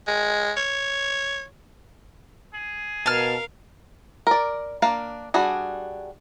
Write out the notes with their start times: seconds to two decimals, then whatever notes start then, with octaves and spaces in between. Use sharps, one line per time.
0.07 G#3
0.57 C#5
2.54 G#4
3.06 B2 A#4 F5 A5 F6
4.27 A#4 D5
4.82 A#3 D4 F5
5.34 G3 D4 F#4 G#4